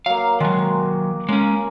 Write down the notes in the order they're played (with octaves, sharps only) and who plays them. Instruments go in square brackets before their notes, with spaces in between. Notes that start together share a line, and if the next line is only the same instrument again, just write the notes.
[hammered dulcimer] F#3 A#3 [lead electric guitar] F5
[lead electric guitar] D#3 F#3 [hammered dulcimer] G#3
[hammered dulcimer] A#3
[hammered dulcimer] C#3 A#4 [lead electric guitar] G#3 C#4